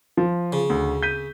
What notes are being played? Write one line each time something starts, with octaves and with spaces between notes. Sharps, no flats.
F3
C#3
D2
G6 B6 D#7